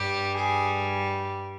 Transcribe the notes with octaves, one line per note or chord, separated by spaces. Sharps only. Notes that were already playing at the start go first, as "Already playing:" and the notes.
Already playing: G2 G3 G4
G#4